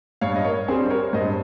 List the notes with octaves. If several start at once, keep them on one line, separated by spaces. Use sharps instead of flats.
G2 C#5 F5
D#5
A#4 C#5
G3 C4 G#4 C5
A#4 C#5
G2 C5 D#5